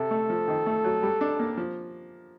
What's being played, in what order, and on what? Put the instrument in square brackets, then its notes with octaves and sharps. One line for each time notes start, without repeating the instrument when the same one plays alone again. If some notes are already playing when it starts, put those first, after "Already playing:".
Already playing: [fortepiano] C3 [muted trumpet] A4
[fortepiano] A3
F3
D#3
A3
F#3
G3
D4
A#3
F3